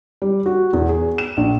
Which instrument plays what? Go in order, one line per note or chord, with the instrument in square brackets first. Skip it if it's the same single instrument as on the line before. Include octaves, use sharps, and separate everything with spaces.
[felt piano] G3
F#4
E2
G#4
E7
A#1